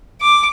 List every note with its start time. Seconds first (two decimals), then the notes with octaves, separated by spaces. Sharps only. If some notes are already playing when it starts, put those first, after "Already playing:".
0.22 D6